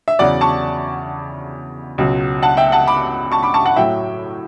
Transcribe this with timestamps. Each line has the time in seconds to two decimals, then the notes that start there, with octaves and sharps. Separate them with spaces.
0.08 E5
0.19 E2 C#3 F#3 D5 F#5
0.41 A5 C#6
1.98 C#2 B2 F#3
2.43 F#5 A5
2.57 E5 G5
2.72 F#5 A5
2.87 B5 D6
3.32 A5 C#6
3.43 B5 D6
3.54 A5 C#6
3.65 F#5 A5
3.76 A2 F#3 E5 G5